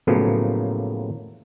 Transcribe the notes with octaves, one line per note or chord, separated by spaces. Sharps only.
A2 C#3 F3 F#3 A#3 B3